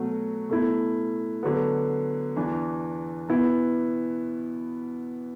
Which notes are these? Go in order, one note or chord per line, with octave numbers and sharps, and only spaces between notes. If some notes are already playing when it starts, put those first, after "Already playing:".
Already playing: B2 F#3 A3 F#4
B2 A3 E4
D3 F#3 B3
E2 E3 D4
B2 B3 E4